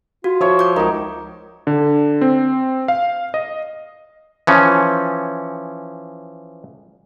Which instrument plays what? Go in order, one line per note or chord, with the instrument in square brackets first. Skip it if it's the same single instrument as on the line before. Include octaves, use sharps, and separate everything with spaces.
[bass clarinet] F4 [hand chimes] F#4
[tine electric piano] F3 [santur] C#5 E5
[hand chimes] D6 G6
[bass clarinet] C#2 [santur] D#4 D6 [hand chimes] A#4
[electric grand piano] D3
C4
F5
D#5
[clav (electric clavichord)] E3 F3 C#4